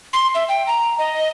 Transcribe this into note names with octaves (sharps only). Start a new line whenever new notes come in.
C6
E5
G5
A#5
D#5